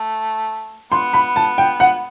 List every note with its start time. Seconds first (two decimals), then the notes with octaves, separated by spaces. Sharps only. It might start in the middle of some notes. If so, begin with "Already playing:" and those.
Already playing: A3
0.91 B3 C6
1.13 B5
1.36 A5
1.58 G5
1.80 F#5